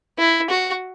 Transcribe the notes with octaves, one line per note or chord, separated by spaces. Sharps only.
E4
F#4